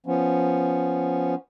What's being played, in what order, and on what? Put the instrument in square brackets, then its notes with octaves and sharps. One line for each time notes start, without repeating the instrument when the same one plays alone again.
[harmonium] F3 B3 C#4